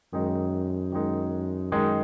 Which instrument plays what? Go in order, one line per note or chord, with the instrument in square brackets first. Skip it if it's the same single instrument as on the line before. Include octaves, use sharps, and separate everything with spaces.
[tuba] F#2 [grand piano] D#3 G#3 D#4
[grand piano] D#3 G#3 D#4
D#3 G#3 D#4